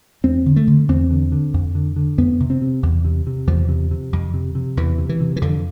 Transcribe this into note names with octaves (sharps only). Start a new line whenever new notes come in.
E2 C4
D3
A3
D3
E2 C4
D3
D3
F2
D3
D3
F2 B3
C3
C4
C3
E2
C3
C3
E2 F3
C3
C3
F2
C3
C3
E2 E3
C3
E3
C3
E3
F2 D3